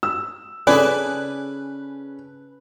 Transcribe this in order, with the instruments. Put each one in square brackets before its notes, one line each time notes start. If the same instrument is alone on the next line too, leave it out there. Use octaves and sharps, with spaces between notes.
[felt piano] E6
[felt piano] C#3 C#4 [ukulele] G#4 A4 D5 [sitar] B4 [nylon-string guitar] G#5